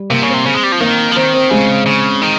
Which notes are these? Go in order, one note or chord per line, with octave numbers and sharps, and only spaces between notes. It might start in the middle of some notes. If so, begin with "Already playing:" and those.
Already playing: G3
C3 A#3
C#3
C4
C3
C#3
G#3
G3
F3
D#3 A#3
F3
D#3 C4
C4
C#3 G#3
C#3
D#3